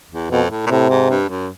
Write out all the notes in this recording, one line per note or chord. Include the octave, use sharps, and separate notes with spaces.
E2
F2 B2
A2
A#2
A2 C3
G#2
G2
F#2